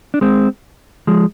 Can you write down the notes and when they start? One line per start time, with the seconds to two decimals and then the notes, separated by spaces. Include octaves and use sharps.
0.14 D4
0.21 G#3 C4
1.07 F3 G#3